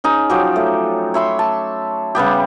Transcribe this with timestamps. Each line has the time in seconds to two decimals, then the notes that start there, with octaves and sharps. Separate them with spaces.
0.04 C#4 D#4 G#4
0.30 F3 F#3 G4
0.56 A3
1.14 C#5 E5 B5 C6
1.39 A5
2.15 C#3 G3 B3 G4